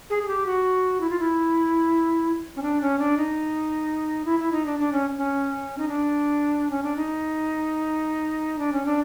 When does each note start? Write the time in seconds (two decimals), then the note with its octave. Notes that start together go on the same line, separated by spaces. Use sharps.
0.10 G#4
0.23 G#4
0.28 G4
0.46 F#4
1.00 E4
1.09 F4
1.19 E4
2.56 C#4
2.62 D4
2.81 C#4
2.99 D4
3.17 D#4
4.25 E4
4.39 E4
4.52 D#4
4.66 D4
4.79 D4
4.92 C#4
5.18 C#4
5.78 D#4
5.88 D4
6.70 C#4
6.83 D4
6.96 D#4
8.58 D4
8.72 C#4
8.86 D4